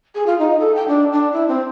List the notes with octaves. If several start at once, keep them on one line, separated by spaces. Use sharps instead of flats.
G#4
F4
D#4
A4
G5
D4
D4
E4
C4